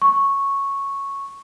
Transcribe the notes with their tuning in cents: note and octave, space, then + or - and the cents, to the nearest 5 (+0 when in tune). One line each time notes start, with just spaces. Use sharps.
C#6 -5